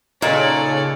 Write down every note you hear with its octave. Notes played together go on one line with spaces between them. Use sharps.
A#2 C#3 D#4 A4 C#5 D5